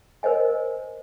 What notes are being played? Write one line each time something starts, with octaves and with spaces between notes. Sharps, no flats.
A#4 C5 C#5 D#5 G#5